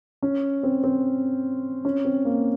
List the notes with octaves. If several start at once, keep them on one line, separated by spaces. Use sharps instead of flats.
C#4
C4
C4
C#4
C4
A#3